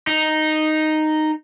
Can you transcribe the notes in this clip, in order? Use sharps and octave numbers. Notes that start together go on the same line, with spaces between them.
D#4